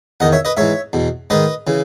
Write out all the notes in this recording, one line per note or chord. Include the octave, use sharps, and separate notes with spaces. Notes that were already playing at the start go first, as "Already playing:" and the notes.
E2 D#3 D#5 F#5
C#5 E5
B4 D#5
G#2 E3 C#5 E5
E2 B2
G#2 D#3 B4 D#5
C#3 E3